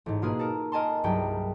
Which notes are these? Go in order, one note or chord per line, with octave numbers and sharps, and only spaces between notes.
A1 G#2
B2 A#3 F4 G#4 B4
A4 A#4
A#4 D#5 G#5 A5 C6
C2 G2 F#3 G#4 G5